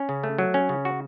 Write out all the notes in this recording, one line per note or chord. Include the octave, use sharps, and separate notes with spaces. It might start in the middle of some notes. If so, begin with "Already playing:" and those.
Already playing: C#4
C#3
A3
F#3
C#4
C#3
F#4